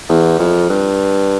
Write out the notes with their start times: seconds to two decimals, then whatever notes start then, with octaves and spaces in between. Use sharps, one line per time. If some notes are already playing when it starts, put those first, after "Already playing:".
0.09 E2
0.39 F2
0.70 G2